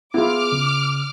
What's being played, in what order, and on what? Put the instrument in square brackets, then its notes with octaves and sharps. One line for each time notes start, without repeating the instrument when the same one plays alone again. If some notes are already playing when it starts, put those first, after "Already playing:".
[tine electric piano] B3 G#4 [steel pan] E4 F4 [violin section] D6 F6
[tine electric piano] C#3